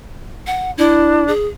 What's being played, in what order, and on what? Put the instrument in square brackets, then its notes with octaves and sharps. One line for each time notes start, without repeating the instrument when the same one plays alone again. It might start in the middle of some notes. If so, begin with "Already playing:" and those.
[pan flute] F#5
[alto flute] D4 [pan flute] E4
[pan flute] G#4